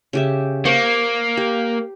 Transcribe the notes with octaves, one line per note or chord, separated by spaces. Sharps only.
C#3 G4 E5
A#3 C5 C#6 D6
G4